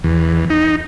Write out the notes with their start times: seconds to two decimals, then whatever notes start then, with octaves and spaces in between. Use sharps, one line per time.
0.04 E2
0.50 D#4